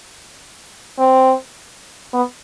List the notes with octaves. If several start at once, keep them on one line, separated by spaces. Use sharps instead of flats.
C4
B3